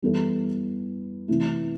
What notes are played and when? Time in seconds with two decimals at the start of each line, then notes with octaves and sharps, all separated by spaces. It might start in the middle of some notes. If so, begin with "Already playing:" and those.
0.02 E3 G3 B3 E4 A4
1.28 C3 E3 A3 E4